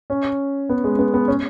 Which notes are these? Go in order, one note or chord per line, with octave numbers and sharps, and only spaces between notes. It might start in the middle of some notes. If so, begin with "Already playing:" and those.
C#4
B3
G#3
B3
B3
C#4